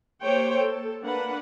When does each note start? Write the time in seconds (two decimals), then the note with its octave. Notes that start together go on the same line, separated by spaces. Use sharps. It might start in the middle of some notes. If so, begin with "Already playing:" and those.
0.23 A#3 G4 C5 C#5 G5
0.55 A4
1.04 A#3 D4 B4 F#5